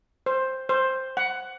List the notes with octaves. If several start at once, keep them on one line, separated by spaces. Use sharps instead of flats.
C5
C5
F#5